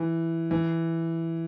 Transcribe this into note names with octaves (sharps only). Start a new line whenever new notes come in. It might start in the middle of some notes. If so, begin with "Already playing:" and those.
Already playing: E3
E3